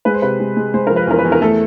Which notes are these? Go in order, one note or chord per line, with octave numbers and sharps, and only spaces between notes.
G#3 B4
C5
C3 B4
G#3
G#3
G#3 C5
F3 A#4
B4
E2 A#4
B4
E2
A#4
A3 A4